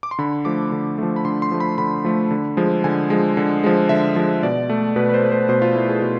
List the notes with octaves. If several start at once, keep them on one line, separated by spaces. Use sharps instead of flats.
D6
C6
D3 B5
F3 A3 D6
D3
F3 A3
B5
D3 C6
C6
F3 A3
B5
D3 B5
F3 A3
D3
F3 G#3
D3 G#5
F3 G#3
D3
F3 G#3
D3 E5
F3 G#3
B2 D5
A3
B2 B4
B4
C5
A3
C5
B2 C5
F4
A3 E4
G#4
B2